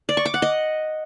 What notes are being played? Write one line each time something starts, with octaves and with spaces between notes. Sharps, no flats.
D5
C#6
D6
F#5
D#5